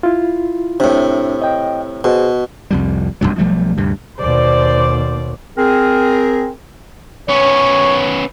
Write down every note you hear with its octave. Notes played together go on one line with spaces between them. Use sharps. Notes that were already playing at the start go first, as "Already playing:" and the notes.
E4 F4
A2 C3 D4
D#5 G5
B2 G#4 C5
C2 F2 G3
G#1 E2 G2 F#3
B1 F3 G3 A3
D2 G2 C3
D#2 B2 C5 D5
C4 G#4 A#4
B3 C#4 C#5